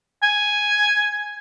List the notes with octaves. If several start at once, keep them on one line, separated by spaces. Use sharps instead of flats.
G#5